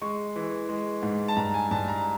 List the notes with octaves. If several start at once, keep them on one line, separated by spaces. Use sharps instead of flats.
G#3 C#6
E3
G#3
G#2
A5
G2 A#5
G#5
G2 A5
A#5